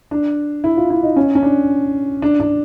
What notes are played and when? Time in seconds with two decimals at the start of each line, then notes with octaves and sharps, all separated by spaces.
0.11 D4
0.64 E4
0.77 F4
0.90 E4
1.03 D#4
1.16 C#4
1.35 C#4
1.43 D4
2.22 D4
2.40 D4